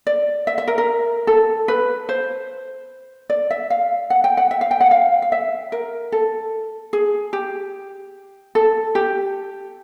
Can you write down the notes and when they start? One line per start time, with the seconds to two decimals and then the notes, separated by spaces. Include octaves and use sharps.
0.07 D5
0.47 E5
0.58 E5
0.68 A#4
0.78 A#4
1.27 A4
1.68 B4
2.09 C5
3.30 D5
3.51 E5
3.70 F5
4.10 F#5
4.24 G5
4.37 F#5
4.51 E5
4.61 F5
4.71 G5
4.81 F#5
4.91 F5
5.22 F5
5.32 E5
5.72 A#4
6.12 A4
6.93 G#4
7.33 G4
8.55 A4
8.95 G4